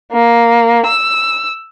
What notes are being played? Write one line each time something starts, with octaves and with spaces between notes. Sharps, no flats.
A#3
E6